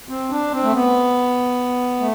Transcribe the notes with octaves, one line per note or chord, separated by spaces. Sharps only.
C4
D4
C4
A3
B3
A3